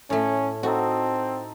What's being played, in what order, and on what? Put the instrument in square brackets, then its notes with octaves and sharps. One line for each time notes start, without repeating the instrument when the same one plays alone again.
[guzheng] A2 A3 [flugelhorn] C#4
[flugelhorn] C4 [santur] D#4 A4 D#5 [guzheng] F#4